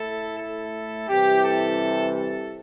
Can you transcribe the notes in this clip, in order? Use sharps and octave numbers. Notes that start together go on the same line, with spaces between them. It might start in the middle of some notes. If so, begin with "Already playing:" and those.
Already playing: A2 A3 E4 A4
A4
C3 E3 G3 E4 G4
A4
A4